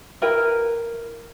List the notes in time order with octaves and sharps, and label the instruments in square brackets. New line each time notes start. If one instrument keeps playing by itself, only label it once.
[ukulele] E4 A#4 B4 G5